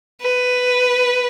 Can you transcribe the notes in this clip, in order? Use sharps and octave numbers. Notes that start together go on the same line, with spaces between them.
B4